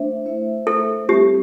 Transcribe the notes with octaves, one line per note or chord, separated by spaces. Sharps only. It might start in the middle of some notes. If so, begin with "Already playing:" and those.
Already playing: A3 D4 C5 E5
A3 E4 C5 E5
A4
G3 C4 E4 G4